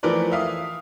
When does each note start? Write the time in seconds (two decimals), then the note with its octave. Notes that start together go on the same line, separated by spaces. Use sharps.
0.03 E3 F3 A3 A#4 B4 D5
0.32 E5 F5 D#6